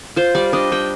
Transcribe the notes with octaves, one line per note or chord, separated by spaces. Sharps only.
F4 C5
G3 D5
D4 D#5
G3 G5